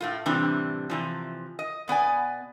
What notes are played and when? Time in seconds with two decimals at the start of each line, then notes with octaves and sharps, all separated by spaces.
0.01 A2 A3 F4
0.26 A2 C3 E3 G3 C4 D4
0.90 C3 E3 F3
1.59 D#5
1.88 B2 B3 D5 G#5